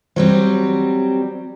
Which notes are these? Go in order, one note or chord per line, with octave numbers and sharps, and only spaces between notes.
E3 F#3 G3 C4